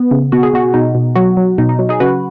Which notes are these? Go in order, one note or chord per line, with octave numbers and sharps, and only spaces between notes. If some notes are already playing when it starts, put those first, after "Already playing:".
Already playing: B3
C#3
B2 F#4
G#4
B2 F#4
B2 D#4
B2
F#3 F#4
F#3
B2 D#4
D#4
F#3
D#4 G#4
C#3 F#4 B4